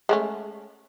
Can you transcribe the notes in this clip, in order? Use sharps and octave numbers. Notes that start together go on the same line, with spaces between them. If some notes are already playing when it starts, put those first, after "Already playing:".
G#3 A3 C#4